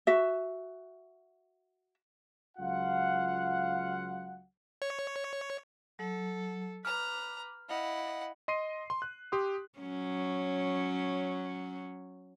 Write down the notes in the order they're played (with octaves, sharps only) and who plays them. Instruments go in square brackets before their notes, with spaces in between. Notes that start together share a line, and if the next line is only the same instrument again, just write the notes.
[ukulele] F#4 E5
[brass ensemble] C#2 F#3 F4 F5 F#5
[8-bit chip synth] C#5
[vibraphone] F#3 [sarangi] A4
[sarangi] B4 [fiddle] A#5 [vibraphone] D6 [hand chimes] F6
[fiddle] E4 F#5 [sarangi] D#5 [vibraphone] F5
[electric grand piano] D#5 C6 C7 D#7
C6
F#6
G4 C6 D#6
[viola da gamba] F#3 C#4